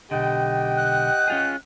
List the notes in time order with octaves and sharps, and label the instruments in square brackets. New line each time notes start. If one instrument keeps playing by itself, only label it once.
[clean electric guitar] B1 D3 [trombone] G4 [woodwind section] D#5 F#5 G5
[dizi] F#6
[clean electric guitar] C#4 F4 G#4